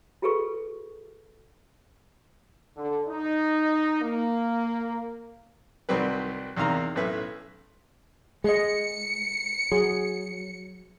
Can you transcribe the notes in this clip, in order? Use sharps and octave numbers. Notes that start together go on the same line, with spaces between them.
F4 F#4 G#4 A4 B4 C#6
D3
D#4
A#3
C2 D#3 F#3 G3 C4 B4
E2 C3 D#3 F5 A#5
B1 A2 C#4 B4 E5
G#3 G#4 D#5 C#7
F#3 G#4